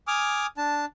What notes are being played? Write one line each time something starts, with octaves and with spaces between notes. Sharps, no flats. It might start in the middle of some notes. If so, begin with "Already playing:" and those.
G#5 D6 D#6 F6
D4 A5